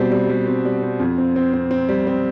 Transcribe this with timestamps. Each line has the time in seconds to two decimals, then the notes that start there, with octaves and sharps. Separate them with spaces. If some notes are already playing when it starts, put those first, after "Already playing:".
Already playing: B2 G3 C4
0.11 G3
0.30 G3
0.47 C4
0.65 G3
0.83 C4
1.00 F2
1.18 C4
1.36 C4
1.53 C4
1.71 C4
1.89 G3
2.07 C4